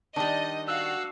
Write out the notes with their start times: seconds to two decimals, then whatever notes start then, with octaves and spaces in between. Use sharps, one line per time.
0.16 D#3 G3 D4 D#5
0.68 F#4 F5 E6 F#6